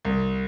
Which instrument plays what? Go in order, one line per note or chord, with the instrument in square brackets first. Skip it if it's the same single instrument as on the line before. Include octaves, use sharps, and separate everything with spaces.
[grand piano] C2